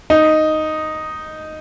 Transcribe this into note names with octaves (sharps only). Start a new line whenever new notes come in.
D#4